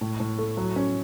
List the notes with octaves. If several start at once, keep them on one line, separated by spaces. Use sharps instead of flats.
A2
A2
A3
F#3
C#4